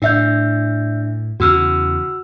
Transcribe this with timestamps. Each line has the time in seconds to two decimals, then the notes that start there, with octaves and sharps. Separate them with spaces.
0.02 A2 D4 E5 G6
1.40 E2 C#3 F#4 E6 F6